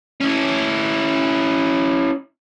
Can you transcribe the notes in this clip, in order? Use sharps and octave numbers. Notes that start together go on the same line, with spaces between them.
C#4 E4